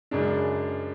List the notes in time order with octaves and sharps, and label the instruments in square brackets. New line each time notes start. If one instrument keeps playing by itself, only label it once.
[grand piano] F#2 C#3 G#3 D4